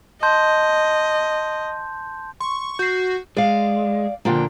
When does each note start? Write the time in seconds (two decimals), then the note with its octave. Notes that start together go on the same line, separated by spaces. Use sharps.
0.23 D#5 A5 C6 G6
2.40 C6 C#6
2.79 F#4 G6 C7
3.37 G#3 D5 F5
4.25 A#2 D3 F3 A#3 D4 G5